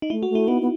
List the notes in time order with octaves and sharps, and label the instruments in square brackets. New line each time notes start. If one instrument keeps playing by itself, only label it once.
[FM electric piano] D#4
[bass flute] A3 [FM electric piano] E4
[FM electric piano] F#4
[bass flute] A3
[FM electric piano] E4
[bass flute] B3 [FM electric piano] D#4
[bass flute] B3